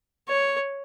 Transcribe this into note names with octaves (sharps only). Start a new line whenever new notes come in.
C#5